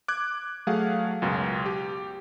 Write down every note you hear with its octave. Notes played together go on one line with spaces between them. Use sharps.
D6 F#6 G#6
F#3 A3 G#4 F5 F#5
C#2 F#2 B2
G4